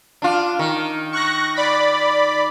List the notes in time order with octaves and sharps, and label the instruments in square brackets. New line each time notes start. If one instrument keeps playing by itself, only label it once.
[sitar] D4 F4
D#3
[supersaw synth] C#6 F#6 A#6
D5 B5